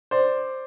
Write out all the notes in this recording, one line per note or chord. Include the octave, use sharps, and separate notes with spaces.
C5 D5